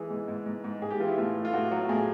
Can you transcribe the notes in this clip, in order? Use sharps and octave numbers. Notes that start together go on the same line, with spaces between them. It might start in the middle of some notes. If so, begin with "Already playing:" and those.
Already playing: E3 G#3 G#4
G#2
G#2
G#2
G#2
G#2 G#4
G4
E3 F4
E4
A2 F4
A3
F4
A2 F#4
F#3 F#4
A2 G#4